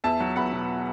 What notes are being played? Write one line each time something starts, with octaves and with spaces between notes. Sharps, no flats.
E2 E5 A5
F#3
E2 F#5 B5
B2